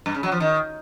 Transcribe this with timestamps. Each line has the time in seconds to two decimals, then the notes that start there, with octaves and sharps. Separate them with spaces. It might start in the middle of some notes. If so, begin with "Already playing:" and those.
0.06 G2
0.14 C#3
0.23 F#3
0.32 F3
0.40 D#3